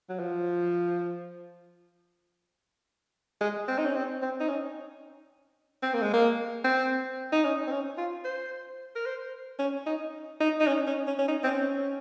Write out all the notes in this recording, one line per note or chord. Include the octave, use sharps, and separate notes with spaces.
F#3
F3
G#3
C4
D#4
C#4
C4
C4
D#4
C#4
C4
A#3
G#3
A#3
C4
D#4
C#4
C4
C#4
F4
C5
A#4
C5
C#4
D#4
D#4
D#4
C#4
C#4
C#4
C#4
D#4
C4
C#4